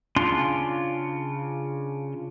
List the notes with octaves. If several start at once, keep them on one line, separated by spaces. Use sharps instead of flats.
C#3 C#4 D4 F4 C6